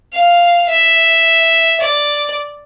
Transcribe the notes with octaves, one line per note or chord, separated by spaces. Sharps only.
F5
E5
D5